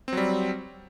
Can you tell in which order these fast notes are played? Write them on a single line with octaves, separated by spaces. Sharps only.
C4 F#3 G3